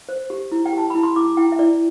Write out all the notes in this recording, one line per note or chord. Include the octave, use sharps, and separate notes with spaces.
C5
G4
E4
G5
G4 A5
E4 B5
C6
E4 D6
E4 G5
E5
E4 D5